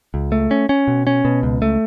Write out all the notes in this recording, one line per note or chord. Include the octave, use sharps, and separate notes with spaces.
C#2
A3
C#4
C#4
B2
C#4
B2
C#2
A3